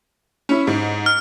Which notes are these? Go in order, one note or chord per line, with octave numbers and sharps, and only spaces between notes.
C#4 E4
G#2
F6